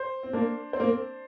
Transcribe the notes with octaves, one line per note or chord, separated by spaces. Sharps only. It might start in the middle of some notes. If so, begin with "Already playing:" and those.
Already playing: C5
C4
A#3 D4
C4 C5
A#3
C4